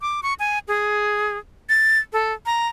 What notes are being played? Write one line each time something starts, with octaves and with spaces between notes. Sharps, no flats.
D6
C#6
G#5
G#4
A6
A4
A#5